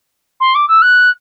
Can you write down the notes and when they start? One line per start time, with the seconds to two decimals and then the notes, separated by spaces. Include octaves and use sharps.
0.40 C6
0.55 D6
0.68 E6
0.82 F#6